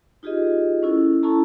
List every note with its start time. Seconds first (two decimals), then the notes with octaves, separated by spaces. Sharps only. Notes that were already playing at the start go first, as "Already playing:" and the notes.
0.23 D#4 F4 G4 G#4 D#5
0.83 C#4 E4 A4
1.23 C#4 E4 A4 A5 A#5